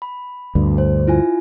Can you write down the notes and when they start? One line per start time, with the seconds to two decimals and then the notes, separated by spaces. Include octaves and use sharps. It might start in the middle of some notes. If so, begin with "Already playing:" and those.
0.02 B5
0.55 D2 G2
0.78 C5
1.07 E4 F4 G#5